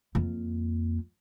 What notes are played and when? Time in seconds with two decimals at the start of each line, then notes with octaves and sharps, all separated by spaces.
0.15 F2 A#3